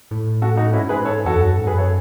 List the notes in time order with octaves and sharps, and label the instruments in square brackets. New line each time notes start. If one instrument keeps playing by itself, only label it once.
[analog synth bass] A2
[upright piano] F#4 A4
D#4 F#4
[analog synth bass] G#2 [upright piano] C#4 E4
[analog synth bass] G#2 [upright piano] G#4 B4
[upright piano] A4 C#5
[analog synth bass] E2 [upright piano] F#4 A4
[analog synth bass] F#2
G#2
[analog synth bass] F#2 [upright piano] G#4 B4
[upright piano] A4 C#5